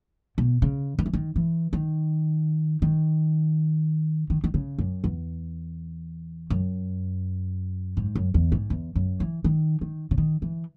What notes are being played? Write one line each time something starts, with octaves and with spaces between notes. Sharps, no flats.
B2
C#3
D#3
E3
D#3
E3
D#3
D#3
D#3
D#3
C#3
F#2
E2
F#2
G#2
F#2
E2
G#2
E2
F#2
E3
D#3
D#3
C#3
D#3
E3